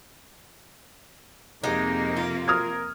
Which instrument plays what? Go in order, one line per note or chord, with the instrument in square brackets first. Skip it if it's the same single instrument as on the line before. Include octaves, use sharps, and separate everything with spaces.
[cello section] F2 C3 A#3 [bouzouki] G#3 G4 [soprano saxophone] D#4
[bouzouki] F4
[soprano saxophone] A#4 [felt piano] D#6 F6 G#6